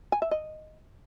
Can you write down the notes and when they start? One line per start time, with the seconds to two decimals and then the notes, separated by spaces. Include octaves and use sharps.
0.12 G#5
0.22 E5
0.31 D#5